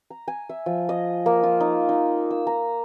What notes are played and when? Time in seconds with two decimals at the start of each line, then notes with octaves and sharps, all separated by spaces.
0.10 A#5
0.28 G#5
0.49 E5
0.66 F3
0.89 D#5
1.26 A#3
1.43 F4
1.60 D#4
1.89 D#4
2.31 E6
2.47 A#5